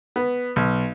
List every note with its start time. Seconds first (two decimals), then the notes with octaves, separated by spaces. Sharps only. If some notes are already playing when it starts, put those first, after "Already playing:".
0.16 B3
0.56 B1